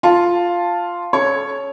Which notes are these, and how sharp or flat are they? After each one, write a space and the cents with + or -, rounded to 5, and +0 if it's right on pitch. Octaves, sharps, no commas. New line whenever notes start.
F4 +0 A5 +0
C#4 +0 A4 -35 C#5 +0